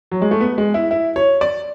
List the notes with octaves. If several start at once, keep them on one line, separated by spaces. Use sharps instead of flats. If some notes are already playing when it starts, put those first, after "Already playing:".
F#3
G#3
A3
B3
G#3
E4
E4
C#5
D5